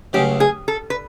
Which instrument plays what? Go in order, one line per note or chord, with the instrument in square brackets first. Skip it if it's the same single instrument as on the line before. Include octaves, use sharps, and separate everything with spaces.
[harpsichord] C#2 C#3 F#3 A3 [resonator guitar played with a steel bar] G4
[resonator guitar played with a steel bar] G#4
A4
B4